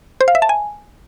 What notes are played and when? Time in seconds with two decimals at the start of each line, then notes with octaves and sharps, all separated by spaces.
0.21 C5
0.28 F5
0.35 E5
0.42 A5
0.49 G#5